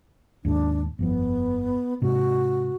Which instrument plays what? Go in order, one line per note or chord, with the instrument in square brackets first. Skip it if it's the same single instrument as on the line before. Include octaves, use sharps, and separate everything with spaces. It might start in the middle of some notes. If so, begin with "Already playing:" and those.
[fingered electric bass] D#2 G#2 [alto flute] D4
[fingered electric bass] G1 F2 F3 [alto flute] B3
[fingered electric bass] G#2 C3 [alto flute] F#4